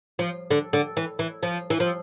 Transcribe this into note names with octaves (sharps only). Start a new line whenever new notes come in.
F3
D3
D3
E3
E3
F3
E3
F3